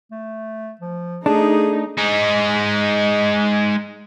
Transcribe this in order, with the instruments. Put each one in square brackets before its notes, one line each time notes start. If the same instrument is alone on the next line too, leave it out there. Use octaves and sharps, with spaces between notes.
[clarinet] A3
F3
[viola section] A3 D#4 [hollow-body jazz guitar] D4 [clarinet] G#4
[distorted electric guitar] G#3 D#4